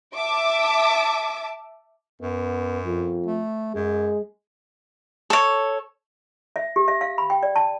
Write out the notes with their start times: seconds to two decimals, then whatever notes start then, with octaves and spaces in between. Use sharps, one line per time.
0.15 E5 A5 D6
2.21 F#2 B3
2.85 F2
3.26 A3
3.74 F#2 G#3
5.30 A4 C#5
6.56 E5
6.76 G4
6.88 E5
7.01 F5
7.18 B5
7.30 G5
7.43 D5
7.56 A5